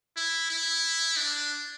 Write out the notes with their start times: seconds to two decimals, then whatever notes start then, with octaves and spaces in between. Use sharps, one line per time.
0.16 E4
0.50 E4
1.17 D4